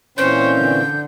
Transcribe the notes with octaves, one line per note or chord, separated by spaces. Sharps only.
A#2 E3 C4 C#4 C5 C#5 G6
D3